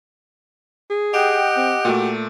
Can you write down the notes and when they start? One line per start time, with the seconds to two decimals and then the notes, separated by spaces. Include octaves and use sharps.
0.90 G#4
1.14 G4 D#5 F#5 G5
1.57 C4
1.85 A#2 A3 F#4